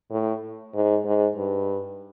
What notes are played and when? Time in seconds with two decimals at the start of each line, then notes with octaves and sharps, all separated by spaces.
0.11 A2
0.74 G#2
1.05 G#2
1.37 G2